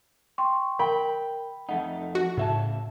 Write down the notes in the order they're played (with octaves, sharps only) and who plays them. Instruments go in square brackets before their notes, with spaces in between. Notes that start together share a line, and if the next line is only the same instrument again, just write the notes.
[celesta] G5 C6 C#6
[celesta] A#4 [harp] G5 B5
[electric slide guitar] F2 A3 D#4 [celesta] F#5
[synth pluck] F#4
[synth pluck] A2 [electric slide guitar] C#3 E5 A5